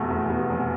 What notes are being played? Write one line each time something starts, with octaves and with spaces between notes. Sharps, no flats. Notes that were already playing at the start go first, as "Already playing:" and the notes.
Already playing: F1 E2 B2 A3
E2
B2
F1